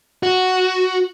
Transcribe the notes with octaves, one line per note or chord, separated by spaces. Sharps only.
F#4